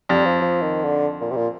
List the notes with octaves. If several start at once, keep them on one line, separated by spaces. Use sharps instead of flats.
F2 G3
F3
F3
D#3
D3
A#2
C3
A#2